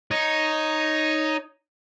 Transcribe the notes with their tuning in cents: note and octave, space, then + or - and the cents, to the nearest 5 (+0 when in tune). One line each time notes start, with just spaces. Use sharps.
D#4 +0 C#5 +0